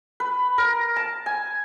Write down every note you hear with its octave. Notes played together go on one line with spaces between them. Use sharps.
B4
A#4
A5
G#5